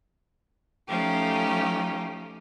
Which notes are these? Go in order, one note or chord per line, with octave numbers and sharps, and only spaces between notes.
F3 A3 C#4 D#4 G4